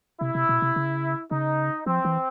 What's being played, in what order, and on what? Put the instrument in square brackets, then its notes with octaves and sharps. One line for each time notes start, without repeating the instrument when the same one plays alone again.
[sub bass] C3 [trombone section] E4
[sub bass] C3
B2
C3
C#3
[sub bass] C#3 [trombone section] D#4
[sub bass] F3 [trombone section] C4
[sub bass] E3